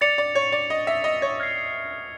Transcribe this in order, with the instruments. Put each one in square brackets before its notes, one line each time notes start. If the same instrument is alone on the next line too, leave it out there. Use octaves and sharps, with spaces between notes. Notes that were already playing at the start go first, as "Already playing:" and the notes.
[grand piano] D5 [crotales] A6 C#7 F7
[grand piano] D5
C#5
D5
D#5
E5
D#5
C#5
[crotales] F6 G#6 C7